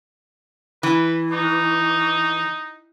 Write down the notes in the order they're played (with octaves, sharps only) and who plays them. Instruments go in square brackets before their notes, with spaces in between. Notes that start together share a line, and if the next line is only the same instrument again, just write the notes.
[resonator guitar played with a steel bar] E3 [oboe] B4
[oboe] D#4